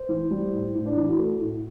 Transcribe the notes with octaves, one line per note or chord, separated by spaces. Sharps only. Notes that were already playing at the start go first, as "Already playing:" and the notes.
Already playing: C5
E3
G3
A2
A2
D4
E3 E4
F#4
A3
A2